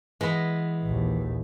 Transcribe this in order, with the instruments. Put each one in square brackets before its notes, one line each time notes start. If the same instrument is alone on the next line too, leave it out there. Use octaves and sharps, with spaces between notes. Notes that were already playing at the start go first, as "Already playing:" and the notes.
[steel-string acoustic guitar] E3 [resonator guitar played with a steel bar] G#3 B3
[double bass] A#1 D#2